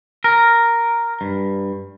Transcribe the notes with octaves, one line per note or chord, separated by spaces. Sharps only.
A#4
G2